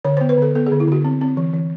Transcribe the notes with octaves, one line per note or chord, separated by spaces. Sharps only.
D3 C#5
B3 C5
B4
D3 A4
B3 A4
G#4
D3
E4
D3 F#4
C4
C4
E3
E3